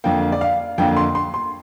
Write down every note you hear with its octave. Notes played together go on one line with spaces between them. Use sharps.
F2 D3 A#3 G5
D5
F5
F2 D3 A#3 G5
C6
C6
C6